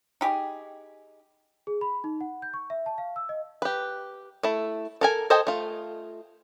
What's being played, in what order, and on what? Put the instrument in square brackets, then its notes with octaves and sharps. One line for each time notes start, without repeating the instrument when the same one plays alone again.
[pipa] D#4 G4 G#4
[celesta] G#4
B5
D#4
F#5
G6
C#6
E5
A5
F5
E6
D#5
[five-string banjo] G4 B4
A3 E4
A4 A#4 G#5
A4 C5 D#5 G5 G#5
A3 F4